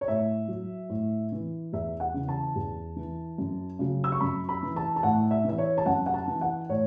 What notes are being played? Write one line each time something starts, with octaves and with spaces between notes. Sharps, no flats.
C#5
A2 E5
F#3
A2
E3
E2 E5
F#5
C#3 E3
A5
E2
E3
F#2
C#3 F#3
E6
C#6
F#2 B5
B5
E3
A5
A5
A2 F#5
E5
E3 E5
C#5
A5
F#2 F#5
F#5
A5
E3
F#5
A2 C#5